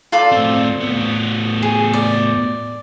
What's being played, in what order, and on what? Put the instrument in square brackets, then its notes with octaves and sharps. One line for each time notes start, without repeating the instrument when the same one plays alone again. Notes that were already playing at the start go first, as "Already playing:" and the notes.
[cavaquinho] F4 A4 D5
[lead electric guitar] A2 C4
A2 B3
[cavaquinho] G#4
D5